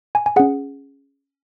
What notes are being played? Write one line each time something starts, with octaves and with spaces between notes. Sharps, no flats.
G#5
G#5
C#4 G#4 F#5